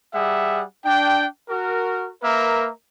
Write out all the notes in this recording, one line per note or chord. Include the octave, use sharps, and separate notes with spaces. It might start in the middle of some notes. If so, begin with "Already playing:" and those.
G3 G#4 E5 F#5
D4 G5
F#4 A#4
A#3 A#4 B4 E5